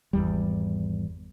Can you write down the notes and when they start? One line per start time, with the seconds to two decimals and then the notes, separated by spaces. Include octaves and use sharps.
0.13 G#1 E2 G3